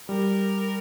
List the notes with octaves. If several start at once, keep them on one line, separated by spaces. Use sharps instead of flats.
G3 A#4